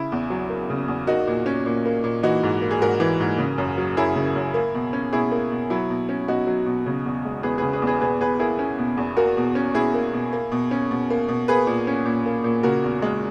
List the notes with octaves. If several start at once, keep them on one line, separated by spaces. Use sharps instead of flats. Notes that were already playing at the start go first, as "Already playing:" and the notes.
Already playing: C#3 E4
E2
F#3
A#3
C#3
E2
A#3 D#4 F#4
A#2
C#4
A#2
A#3
A#2
E3 D#4 F#4
G#2
A#3
G#4
G#2 F#4 A#4
E3
G#2
C#3
F#2
F#3
F#2 E4 G#4
C#3
F#2
A#3
B2
C#4
B2 E4 G#4
A#3
B2
F#3 E4
B2
C#4
B2 D#4 F#4
F#3
B2
C#3
E2
G#3
E2 G#4 B4
C#3 G#4 B4
G#4 B4
E2
G#4 B4
B2 G#4 B4
E2 G#4 B4
A#3 E4 G#4
C#4
B2
E2
A#3 F#4 A#4
B2
C#4
B2 E4 G#4
A#3
B2
A#3
B2
C#4
B2
A#3
B2
A#3 G#4 B4
A#2
C#4
A#2
A#3
A#2
C#3 F#4 A#4
E2
G#3